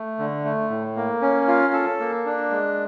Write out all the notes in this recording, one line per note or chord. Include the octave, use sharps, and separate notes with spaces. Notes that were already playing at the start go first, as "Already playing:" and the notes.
Already playing: A3
D3
A3
A2
A#3
C#4
F4
A4
A#3
D4
G#3